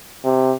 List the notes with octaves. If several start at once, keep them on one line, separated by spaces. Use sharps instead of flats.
C3